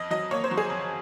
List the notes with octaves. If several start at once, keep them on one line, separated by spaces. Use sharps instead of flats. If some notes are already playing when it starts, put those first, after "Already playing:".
Already playing: F2 D#5
F#3 D#5
A#3 C#5
C5
F#3
G#4
F2